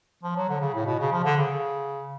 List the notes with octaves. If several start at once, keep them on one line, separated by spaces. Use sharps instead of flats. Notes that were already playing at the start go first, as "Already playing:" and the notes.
F3
F#3
D3
C#3
A2
B2
C#3
F3
D3
C#3